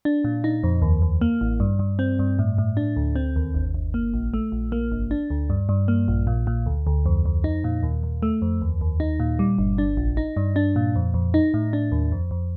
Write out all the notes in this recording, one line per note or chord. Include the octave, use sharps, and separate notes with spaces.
D4
A#2
D#4
F2
D#2
D#2
A#3
A1
G2
G2
C4
G2
A2
A2
D4
D2
C4
D#2
G1
G1
A#3
A#1
A3
A#1
A#3
G1
D4
D2
G2
G2
A#3
A#1
A#2
A#2
D2
D2
F2
F2
D#4
A#2
D#2
D#2
A3
F2
D#2
D#2
D#4
A#2
G3
G1
D4
A#1
D#4
G2
D4
A#2
F2
F2
D#4
A2
D4
D#2
F2
F2